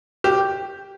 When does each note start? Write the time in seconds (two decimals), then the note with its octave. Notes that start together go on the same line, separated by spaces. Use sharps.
0.24 G4